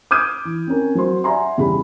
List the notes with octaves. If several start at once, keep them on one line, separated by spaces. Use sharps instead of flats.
D6 D#6 F6 G6 G#6 D#7
E3
C4 C#4 A#4
F#3 C5 C6
D5 E5 F#5 G#5 A#5 C6
E2 C#3 G3 B5